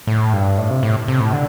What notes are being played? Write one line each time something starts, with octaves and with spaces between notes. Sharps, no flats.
A2
G2
A2
C3
A2
C3
A2
D3